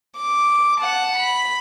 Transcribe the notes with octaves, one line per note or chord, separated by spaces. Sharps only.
D6
F#5 A5
B5